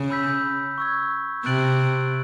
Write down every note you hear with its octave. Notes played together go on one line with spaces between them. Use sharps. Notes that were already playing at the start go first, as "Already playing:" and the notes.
Already playing: C#3
B5 E6 G6 B6
C#6 E6 G#6
C3 F#6 A6 D7 F#7